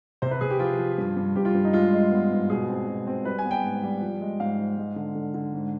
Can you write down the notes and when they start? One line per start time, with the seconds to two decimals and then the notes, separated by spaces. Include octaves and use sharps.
0.22 C3 C5
0.31 B4
0.41 C3 G#4
0.50 G4
0.59 F3 F4
0.79 F3
0.98 G2
1.16 G2
1.36 G2 G4
1.45 F4
1.55 G2
1.65 D#4
1.73 G#3 F4
1.93 G#3
2.12 B3
2.31 G#2
2.50 B2 G#4
2.69 C4
2.88 B2
3.07 C4
3.25 G3 B4
3.38 G#5
3.45 B3
3.51 G5
3.64 G#2
3.83 G3
4.01 F3
4.21 G#3
4.40 G#2 F5
4.58 G#2
4.78 G#3
4.96 D3
5.15 D3
5.34 D3
5.54 G#2